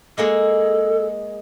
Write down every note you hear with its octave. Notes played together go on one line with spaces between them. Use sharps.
G#3 A#3 G#4 A4